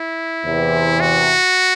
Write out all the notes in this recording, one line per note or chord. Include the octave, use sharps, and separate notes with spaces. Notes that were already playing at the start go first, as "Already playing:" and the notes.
Already playing: E4
E2 C3 E3
F#4